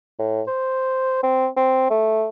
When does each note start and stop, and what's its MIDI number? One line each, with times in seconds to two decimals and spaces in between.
0.19 0.42 45
0.47 1.20 72
1.23 1.48 60
1.57 1.89 60
1.90 2.29 57